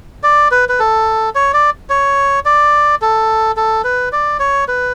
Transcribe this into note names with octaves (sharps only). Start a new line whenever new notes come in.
D5
B4
B4
A4
C#5
D5
C#5
D5
A4
A4
B4
D5
C#5
B4